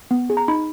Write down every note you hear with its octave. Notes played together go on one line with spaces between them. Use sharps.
B3
G#4
A#5
D#4 B5